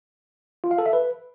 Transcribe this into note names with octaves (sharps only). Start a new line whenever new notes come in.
F4
F5
A4
E5
B4